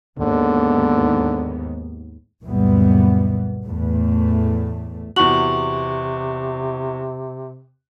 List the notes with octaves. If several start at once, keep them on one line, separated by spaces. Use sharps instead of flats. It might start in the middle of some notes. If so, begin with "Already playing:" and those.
D#2 G#2 D3 B3
C#2 F#2 A#2 E3 G3 B3
E2 A2 A3
E2 C3 F#4 C#6 F#7